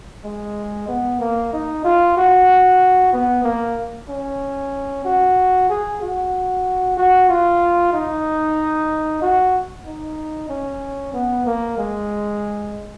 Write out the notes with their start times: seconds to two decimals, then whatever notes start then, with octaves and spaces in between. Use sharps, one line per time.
0.24 G#3
0.88 B3
1.20 A#3
1.53 D#4
1.85 F4
2.17 F#4
3.13 B3
3.44 A#3
4.09 C#4
5.05 F#4
5.70 G#4
6.01 F#4
6.97 F#4
7.29 F4
7.93 D#4
9.22 F#4
9.86 D#4
10.49 C#4
11.14 B3
11.46 A#3
11.78 G#3